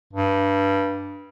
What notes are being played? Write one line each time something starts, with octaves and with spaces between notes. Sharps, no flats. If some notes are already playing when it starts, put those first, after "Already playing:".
G2